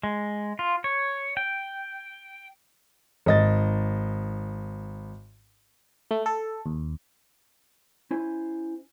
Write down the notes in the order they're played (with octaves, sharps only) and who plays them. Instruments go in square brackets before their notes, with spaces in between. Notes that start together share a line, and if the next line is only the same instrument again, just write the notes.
[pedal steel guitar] G#3
F4
C#5
G5
[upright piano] G#1 D#5 A6
[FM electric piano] A3
A4
D#2
[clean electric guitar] C#4 E4 C5 G#5